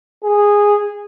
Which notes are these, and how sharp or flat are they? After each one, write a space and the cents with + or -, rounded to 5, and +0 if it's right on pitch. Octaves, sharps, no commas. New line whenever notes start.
G#4 -10